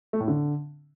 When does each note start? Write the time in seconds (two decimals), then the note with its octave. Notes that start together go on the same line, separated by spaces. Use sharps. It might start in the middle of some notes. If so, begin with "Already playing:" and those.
0.13 A3
0.20 A2
0.28 D3